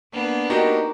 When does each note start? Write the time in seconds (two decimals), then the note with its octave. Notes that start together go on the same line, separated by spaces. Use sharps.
0.11 A#3 B3 D4
0.50 D#4 F#4 G4 A#4